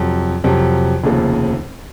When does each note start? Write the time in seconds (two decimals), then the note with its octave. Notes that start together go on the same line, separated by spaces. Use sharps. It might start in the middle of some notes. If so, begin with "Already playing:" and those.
Already playing: F2 C3 F#3
0.44 F2 C3 F#3
1.04 F1 D#2 C#3 F3